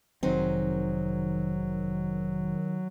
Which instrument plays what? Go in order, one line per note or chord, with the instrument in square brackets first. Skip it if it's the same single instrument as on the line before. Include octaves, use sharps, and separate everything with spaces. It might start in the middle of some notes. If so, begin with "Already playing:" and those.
[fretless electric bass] F1 C4 [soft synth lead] D#3 [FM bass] F#3 [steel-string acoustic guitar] D#4 G#4 C5